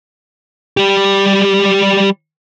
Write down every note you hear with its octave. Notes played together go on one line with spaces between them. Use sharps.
G3 G4